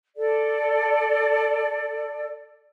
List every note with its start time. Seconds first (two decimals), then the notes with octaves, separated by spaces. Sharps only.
0.17 A4 D5